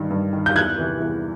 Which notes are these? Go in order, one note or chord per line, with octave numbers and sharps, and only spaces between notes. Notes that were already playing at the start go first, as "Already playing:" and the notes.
Already playing: G2 D#3
G2
D#3
G6
E2 F#6 G#6
C3 E3
E2